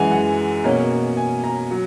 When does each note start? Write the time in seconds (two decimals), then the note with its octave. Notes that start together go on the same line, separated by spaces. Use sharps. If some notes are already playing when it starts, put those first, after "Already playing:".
Already playing: F#2 E3 G#3 F#5 G#5
0.11 F#5
0.64 B2 A#3 C#4
1.17 G#5
1.44 A#5
1.71 F#3